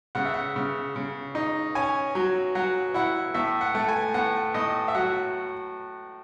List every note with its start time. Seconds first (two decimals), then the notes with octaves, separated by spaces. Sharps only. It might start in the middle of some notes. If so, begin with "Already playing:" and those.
0.15 C#3 F#5
0.25 E5
0.34 F#5
0.56 C#3
0.96 C#3
1.35 D#4
1.75 C#4 G#5
2.15 F#3
2.55 F#3 F#5
2.94 E4 F#5
3.34 A2 E5
3.61 F#5
3.75 A3
3.88 G#5
4.14 A2 F#5
4.54 A2 D#5
4.88 E5
4.95 F#3 F#5